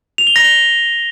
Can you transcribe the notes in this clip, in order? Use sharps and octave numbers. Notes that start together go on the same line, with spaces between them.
F7
G7
A#6
G7